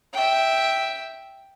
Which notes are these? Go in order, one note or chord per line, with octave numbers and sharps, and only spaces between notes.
E5 G5